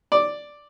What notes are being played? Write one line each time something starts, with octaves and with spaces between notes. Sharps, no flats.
D5